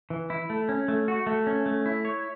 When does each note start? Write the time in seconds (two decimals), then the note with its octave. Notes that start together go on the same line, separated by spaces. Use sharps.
0.10 E3
0.30 E4
0.50 A3
0.69 C#4
0.88 A3
1.08 F#4
1.27 A3
1.47 C#4
1.66 A3
1.86 E4
2.05 C#5